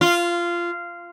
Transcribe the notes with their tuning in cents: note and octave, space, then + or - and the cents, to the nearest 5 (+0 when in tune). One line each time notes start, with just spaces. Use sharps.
F4 -15